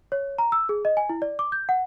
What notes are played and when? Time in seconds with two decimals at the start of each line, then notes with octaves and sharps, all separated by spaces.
0.12 C#5
0.38 A#5
0.52 E6
0.69 G#4
0.85 D#5
0.97 G#5
1.09 E4
1.22 D5
1.39 D6
1.52 G6
1.69 F#5